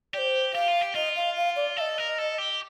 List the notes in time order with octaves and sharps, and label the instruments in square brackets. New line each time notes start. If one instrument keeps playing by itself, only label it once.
[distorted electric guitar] G4 [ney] C5 D5
[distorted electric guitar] G4 [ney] F5
[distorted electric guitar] F4
G4
[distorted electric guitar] F4 [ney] D#5
[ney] F5
F5
D5
[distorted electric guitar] A4 [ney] F5
[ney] D#5
[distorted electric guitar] A#4
A4
G4